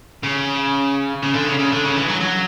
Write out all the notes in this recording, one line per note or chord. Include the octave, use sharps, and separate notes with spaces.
C#3
C#3
D3
C#3
C#3
D3
C#3
E3
F#3
F#3